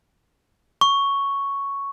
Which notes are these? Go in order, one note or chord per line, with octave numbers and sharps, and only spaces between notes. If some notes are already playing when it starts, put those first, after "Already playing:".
C#6